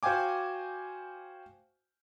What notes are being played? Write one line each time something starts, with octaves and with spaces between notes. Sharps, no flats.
F#4 C5 F5 G5 G#5 D6